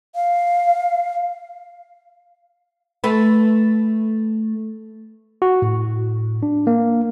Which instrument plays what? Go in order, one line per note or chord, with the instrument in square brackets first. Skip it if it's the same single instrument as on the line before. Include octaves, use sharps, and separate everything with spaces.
[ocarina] F5
[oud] A3 B4
[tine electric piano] F#4
A2
D4
A#3